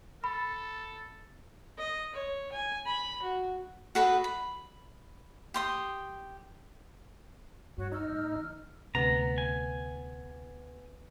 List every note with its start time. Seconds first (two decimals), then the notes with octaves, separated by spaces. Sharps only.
0.24 A4 B5
1.78 D#5
2.15 C#5
2.52 G#5
2.86 B5
3.22 F#4
3.95 F#4 A4 B4 D#5
4.24 B5
5.54 G4 C6 D#6
7.78 G2 F#4 C#5
7.92 D#4 E6 F6
8.12 A2
8.36 E3
8.95 D2 C3 B3 A#5
9.38 G#5